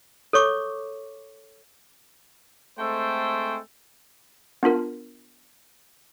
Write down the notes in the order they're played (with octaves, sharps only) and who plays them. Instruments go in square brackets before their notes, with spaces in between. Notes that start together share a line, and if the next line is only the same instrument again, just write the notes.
[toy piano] A4 C#5 C#6 D6
[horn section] G#3 A3 C4 A4 C5 G5
[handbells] B3 D4 F4 A#4